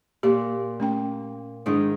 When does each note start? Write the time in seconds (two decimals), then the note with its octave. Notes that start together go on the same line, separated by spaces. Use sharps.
0.23 A#2 G4
0.80 A3 C#4 G5
1.66 G#2 D#3 D4 E4